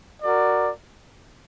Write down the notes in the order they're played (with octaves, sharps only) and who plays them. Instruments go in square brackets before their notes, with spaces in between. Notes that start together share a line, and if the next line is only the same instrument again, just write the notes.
[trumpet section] F#4 A#4 D5